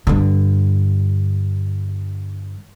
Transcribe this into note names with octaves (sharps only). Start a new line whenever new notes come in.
G2 D3